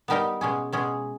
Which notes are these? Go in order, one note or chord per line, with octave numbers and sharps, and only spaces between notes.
G3 B3 D#4 G4 A#4
B2 G#3 C#4 G#4
B2 G#3 C#4 G#4